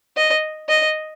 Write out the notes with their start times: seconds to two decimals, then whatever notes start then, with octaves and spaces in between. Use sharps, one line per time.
0.17 D#5
0.69 D#5